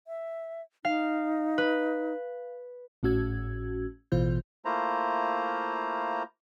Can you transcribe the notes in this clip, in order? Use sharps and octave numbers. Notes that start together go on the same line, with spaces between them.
E5
D#4 F5
B4
G#1 A2 C#4 F#4 E6 G#6
A1 B2 E3 F4 C5 G6
A3 A#3 E4 F4 C5 A#5